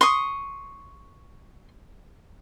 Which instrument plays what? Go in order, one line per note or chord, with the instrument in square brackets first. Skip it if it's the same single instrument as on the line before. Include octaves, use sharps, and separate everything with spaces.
[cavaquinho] C6 C#6 D#6